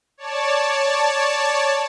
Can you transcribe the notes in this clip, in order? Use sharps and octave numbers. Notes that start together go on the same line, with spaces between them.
C#5 D5 A5